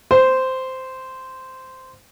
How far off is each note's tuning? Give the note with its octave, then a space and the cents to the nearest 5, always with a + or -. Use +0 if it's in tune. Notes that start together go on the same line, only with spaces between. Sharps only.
C5 -10